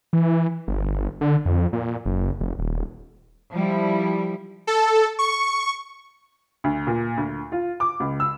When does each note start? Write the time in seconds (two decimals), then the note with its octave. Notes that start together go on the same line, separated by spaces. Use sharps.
0.13 E3
0.68 G1
1.21 D3
1.46 F2
1.73 A#2
2.06 F#1
2.41 F1
2.59 D#1
3.52 F3 G3 E4
4.67 A4
5.19 C#6
6.64 D2
6.87 A#2
7.17 D2
7.52 F4
7.80 D6
8.00 C#2
8.20 E6